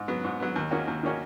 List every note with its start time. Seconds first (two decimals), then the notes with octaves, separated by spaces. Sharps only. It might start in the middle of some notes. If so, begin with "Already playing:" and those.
Already playing: G#2
0.08 F#3 B3
0.24 G#2
0.40 F#3 B3
0.56 D#2
0.71 D#3 A#3 C#4 F#4
0.88 D#2
1.03 D#3 A#3 C#4 F#4